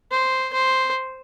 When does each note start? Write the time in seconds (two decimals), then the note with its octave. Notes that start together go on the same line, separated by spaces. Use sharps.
0.11 C5
0.54 C5